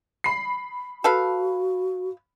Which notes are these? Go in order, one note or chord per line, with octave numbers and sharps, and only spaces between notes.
B5 C7
F#4 A4 B4 F5